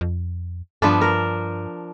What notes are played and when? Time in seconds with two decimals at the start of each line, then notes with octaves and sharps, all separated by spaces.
0.01 F2
0.82 G2 F3 B3 D4
1.01 A#4